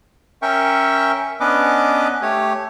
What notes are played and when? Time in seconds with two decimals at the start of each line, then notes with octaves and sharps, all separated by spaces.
0.42 C#4 A#4 E5 G5 C#6
1.40 B3 C#4 D4 B4 D#5 D6
2.22 A3 G4 C#5